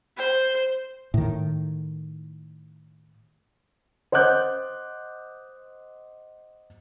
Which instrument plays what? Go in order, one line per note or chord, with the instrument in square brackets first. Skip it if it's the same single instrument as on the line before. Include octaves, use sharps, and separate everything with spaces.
[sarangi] C5
[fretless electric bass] A2 D#3
[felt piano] C5 D#5 F#5 D6 F#6 G6